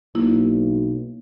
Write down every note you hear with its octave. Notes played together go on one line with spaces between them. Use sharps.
B1 A#3 E4